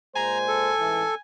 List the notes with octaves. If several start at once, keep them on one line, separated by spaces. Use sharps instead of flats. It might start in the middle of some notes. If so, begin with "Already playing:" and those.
A#2 G#3 C5 G#5 A#5
A4
A1 G#2 E3